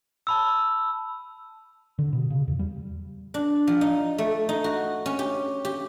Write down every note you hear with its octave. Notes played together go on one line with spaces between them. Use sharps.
A5 B5 E6
D3
B2
C#3
E2
G3
D4
F3
D#4
A3
D#4
F#4
C#4
G4
G4